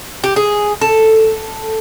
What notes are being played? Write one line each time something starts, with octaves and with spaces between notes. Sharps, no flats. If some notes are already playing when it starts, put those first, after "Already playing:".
G4
G#4
A4